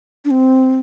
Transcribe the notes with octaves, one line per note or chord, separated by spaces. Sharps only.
D4
C4